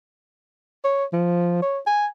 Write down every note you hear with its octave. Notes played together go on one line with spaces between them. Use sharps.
C#5
F3
C#5
G#5